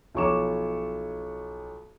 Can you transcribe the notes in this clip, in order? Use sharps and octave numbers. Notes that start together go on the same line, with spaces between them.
B1 F3 C#5 C#6 D6 E7